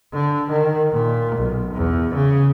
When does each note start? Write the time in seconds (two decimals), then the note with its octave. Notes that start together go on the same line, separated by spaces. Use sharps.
0.13 D3
0.50 D#3
0.92 A#2
1.36 B1
1.74 E2
2.15 C#3